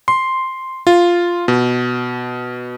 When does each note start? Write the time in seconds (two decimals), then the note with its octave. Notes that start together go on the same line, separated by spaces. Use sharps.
0.08 C6
0.87 F4
1.48 B2